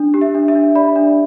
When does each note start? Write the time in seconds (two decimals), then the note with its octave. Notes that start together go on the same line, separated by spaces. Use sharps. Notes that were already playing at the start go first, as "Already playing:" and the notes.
Already playing: D4
0.14 G4
0.21 E5
0.35 D4
0.48 E5
0.55 D4
0.75 D5 B5
0.96 D4